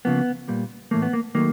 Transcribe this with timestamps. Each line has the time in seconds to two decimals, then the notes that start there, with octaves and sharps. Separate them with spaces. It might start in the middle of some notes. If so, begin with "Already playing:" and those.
0.05 C#3 F3 A#3 B3
0.48 A#2 G3 A#3
0.91 A2 E3 A3 A#3
1.02 B3
1.13 A#3
1.35 D#3 F#3 A3 A#3